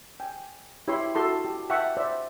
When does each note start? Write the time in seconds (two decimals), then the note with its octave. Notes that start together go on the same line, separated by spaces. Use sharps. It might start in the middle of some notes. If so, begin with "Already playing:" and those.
0.20 G5 G#5
0.88 E4 G4 C#5 E5 B5 C6
1.15 E4 F#4 A4 A5 C6
1.45 G4
1.70 E5 F#5 G5 A5 C#6
1.97 C5 D5 E5